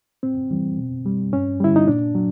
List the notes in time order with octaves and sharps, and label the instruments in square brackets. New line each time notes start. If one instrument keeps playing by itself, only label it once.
[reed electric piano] A2 C4
E3 G3
B2
G3
G2 C#4
D3 G3 E4
D#4
A#2 D4
F#3